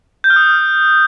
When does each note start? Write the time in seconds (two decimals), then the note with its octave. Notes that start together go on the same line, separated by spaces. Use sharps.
0.24 G6
0.30 F6
0.36 D#6